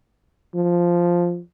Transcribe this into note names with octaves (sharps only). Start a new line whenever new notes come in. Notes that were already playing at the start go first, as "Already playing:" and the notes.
F3